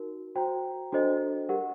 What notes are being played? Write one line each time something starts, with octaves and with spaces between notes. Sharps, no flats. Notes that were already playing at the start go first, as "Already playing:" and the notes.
Already playing: D#4 F#4 A#4
F#4 C5 G5 A#5
D4 F#4 A4 C5 D#5
G4 A#4 F#5